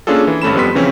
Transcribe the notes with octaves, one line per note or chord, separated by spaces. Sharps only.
A#3 C#4 D4 F4 G#4 A4
E3
G#1 G2 A3 C#4 B5 E7
F2 G3 B3 C6 B6
C#3 E3 F3 C4 C#4